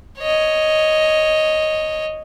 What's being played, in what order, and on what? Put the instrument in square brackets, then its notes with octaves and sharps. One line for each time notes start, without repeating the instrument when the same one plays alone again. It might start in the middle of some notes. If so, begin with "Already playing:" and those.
[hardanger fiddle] C#5 D#5